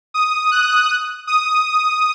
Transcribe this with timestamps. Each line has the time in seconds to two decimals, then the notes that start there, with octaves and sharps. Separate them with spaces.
0.14 D#6
0.51 F#6
1.27 D#6